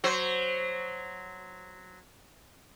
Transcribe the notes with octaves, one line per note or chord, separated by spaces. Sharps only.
F#3 C5